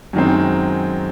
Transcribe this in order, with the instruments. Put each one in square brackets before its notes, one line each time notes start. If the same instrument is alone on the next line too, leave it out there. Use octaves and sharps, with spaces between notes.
[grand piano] F#2 D#3 G#3 C4